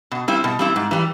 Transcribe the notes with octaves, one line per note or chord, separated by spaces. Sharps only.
B2
G3 C4 E4
B2
G3 C4 E4
G#2
E3 G3